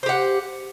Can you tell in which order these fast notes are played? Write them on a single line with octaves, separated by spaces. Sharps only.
C5 G4 F#5